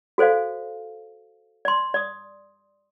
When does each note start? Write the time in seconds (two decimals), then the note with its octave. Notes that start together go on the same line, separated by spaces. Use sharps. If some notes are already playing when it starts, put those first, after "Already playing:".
0.18 F#4 A4 C5 D5 F5
1.65 D5 C6
1.94 D5 D#6